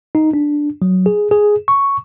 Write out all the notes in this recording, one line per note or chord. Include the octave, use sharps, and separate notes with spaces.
D#4
D4
F#3
G#4
G#4
C#6